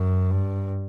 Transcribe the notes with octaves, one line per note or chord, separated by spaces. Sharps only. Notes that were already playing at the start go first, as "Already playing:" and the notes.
Already playing: F#2
G2